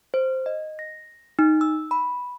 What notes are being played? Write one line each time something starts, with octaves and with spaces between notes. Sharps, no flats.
C5
D#5
A#6
D#4
E6
B5